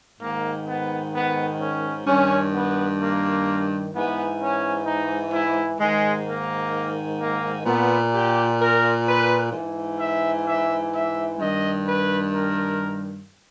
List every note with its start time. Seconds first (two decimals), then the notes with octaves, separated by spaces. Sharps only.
0.20 G#2 D#3 A#3
0.67 B3
1.14 B3
1.60 C#4
2.07 G2 D#3 C#4
2.54 B3
3.00 A#3
3.94 G#2 E3 B3
4.40 C#4
4.86 D#4
5.33 E4
5.80 G#2 D#3 G#3
6.26 A#3
7.19 A#3
7.65 A#2 B3
8.13 G4
8.59 A#4
9.06 B4
9.52 G#2 E3
9.99 E5
10.45 E5
10.93 E5
11.39 G2 D#3 D#5
11.85 B4
12.32 A#4